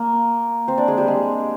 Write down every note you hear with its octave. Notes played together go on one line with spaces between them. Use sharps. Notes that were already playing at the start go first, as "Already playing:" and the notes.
Already playing: A#3 A#4
C4 C5
D4 D5
G#3 G#4
G3 G4
G#3 G#4